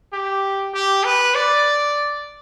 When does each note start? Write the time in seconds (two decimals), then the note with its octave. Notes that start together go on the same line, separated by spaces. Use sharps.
0.13 G4
0.74 G4
1.04 B4
1.35 D5